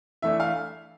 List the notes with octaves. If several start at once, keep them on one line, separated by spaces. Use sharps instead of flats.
E3 A3 D4 E5
F5